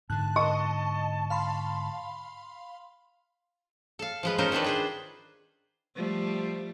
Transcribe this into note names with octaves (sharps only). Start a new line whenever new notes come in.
G#2 D3 A5 F#6
D#5 C#6
F5 B5 C6
A4 F5
F3 G#3 B4
C#4 D#4 F4 A4 A#4 C5
D#3 C4 D4 B4
G#4 B4 C5
F3 G3 A3